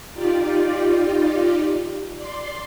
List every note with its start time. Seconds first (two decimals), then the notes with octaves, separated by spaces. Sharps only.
0.15 D#4 F4 G4 D5
2.16 D5 C6